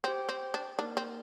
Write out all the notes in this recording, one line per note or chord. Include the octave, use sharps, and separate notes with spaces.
C4 G4 C5 G5
C4
D4
A#3 D4 D#4 A#4 D5
C4